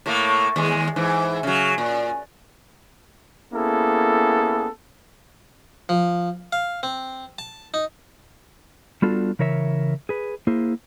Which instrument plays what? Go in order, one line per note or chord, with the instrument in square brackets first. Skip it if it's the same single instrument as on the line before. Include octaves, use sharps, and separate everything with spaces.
[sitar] A2 A3 A#3
D#2 G#3
G#2 E3
C#3 F#3
A#2
[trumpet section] A#3 B3 C#4 E4 G#4 A4
[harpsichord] F3
F5
C4
A5
D#4
[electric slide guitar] G3 B3 D4 F4 F#4 A4
C#3 E3 A#4 C#5 E5
G#4 B4
A#3 E4 G#4 C5